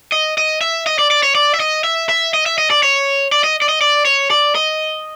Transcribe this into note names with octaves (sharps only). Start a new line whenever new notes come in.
D#5
D#5
E5
D#5
D5
D5
C#5
D5
E5
D#5
E5
E5
D#5
E5
D#5
D5
C#5
D5
D#5
D5
D#5
D5
C#5
D5
D#5